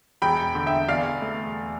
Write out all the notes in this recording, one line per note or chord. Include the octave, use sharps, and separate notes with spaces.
E1 G5 B5
D3
E5 G5
E2 D5 F5
A3